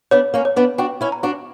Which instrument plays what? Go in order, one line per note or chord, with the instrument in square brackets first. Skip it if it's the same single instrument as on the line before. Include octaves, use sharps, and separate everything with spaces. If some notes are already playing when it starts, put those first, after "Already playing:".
[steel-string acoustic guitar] B3 D4 [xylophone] C#5
[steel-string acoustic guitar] A#3 C#4
[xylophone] C#5
[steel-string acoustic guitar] B3 D4
[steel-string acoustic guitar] D4 F#4 [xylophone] G5
[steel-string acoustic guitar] C#4 E4
[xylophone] A#5
[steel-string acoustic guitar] D4 F#4